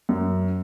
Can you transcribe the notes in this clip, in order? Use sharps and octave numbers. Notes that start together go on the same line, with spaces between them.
F#2